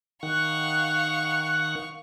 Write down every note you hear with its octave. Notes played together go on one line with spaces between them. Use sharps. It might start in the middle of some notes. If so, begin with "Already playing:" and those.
D#3 F5 F#5 C#6